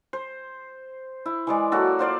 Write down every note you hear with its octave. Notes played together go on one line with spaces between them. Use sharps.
C5
E4
E3 G#3 D5
F#3 A#3 F#4 A4
F4 C5 D5 F5